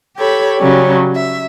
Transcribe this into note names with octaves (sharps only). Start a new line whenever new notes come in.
G4 A4 C#5 B5
C#3 F#3 G3 C#4
E5